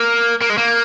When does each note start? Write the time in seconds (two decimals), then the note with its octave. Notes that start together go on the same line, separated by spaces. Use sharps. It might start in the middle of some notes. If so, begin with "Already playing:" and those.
Already playing: A#3
0.41 A#3
0.50 G#3
0.58 A#3